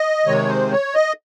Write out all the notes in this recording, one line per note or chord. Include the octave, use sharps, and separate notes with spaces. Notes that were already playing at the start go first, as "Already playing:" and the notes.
Already playing: D#5
C3 D#3 G#3 C#5
C5
C#5
D#5